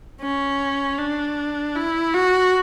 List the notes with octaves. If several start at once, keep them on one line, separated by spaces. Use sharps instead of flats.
C#4
D4
E4
F#4